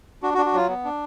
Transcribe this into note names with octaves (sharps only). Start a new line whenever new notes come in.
D4 F#4
F#4
D4
F#4
F#3 F4
B3
D4